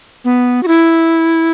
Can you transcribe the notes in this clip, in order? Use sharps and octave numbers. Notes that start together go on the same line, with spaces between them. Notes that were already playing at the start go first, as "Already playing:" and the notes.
B3
F#4
E4